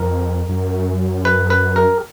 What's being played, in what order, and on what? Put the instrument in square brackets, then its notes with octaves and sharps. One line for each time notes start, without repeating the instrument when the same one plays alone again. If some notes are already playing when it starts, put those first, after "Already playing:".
Already playing: [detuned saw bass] F2 [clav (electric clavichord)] A#4
[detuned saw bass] F#2
[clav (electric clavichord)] B4
B4
A#4